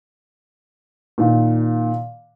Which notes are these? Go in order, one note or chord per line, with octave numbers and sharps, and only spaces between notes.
A#2 D#3